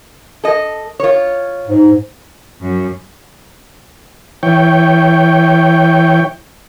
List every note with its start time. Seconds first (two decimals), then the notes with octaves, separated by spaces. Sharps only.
0.44 A4 D#5
1.00 F4 C#5
1.67 G#2
2.61 F#2
4.43 E3 C#5 G5